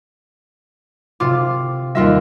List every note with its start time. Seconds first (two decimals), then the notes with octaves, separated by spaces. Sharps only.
1.20 C3 F4 D6
1.95 D#2 G3 F4 E5